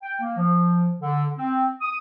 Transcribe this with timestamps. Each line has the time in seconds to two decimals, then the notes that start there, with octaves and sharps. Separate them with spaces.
0.03 G5
0.20 A#3
0.37 F3
1.02 D3
1.38 C4
1.81 D#6